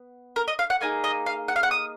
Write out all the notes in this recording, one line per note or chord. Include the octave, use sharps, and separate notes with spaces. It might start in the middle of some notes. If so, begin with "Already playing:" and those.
Already playing: B3
A#4
D#5
F5
F#5
A#3 D#4 G#4 G#5
D#5
F5
F#5
F5
F#5
D#6